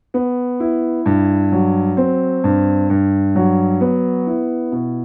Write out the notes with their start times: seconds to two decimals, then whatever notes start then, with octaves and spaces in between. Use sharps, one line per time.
0.14 B3
0.60 E4
1.06 G2
1.52 F#3
1.97 C4
2.44 G2
2.90 G2
3.35 F#3
3.81 B3
4.27 E4
4.72 B2